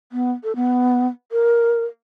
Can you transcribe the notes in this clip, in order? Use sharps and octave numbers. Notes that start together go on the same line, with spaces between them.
B3
A4
B3
A#4